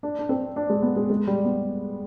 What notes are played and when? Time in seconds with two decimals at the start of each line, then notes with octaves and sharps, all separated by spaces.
0.03 D4
0.19 D4
0.29 C4
0.56 D4
0.70 G#3
0.82 B3
0.96 G#3
1.10 G#3
1.27 G3
1.45 B3